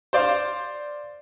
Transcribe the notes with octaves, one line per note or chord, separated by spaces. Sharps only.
C5 D5 F5